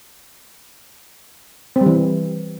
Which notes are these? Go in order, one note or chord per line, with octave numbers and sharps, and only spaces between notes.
C4
G3
E3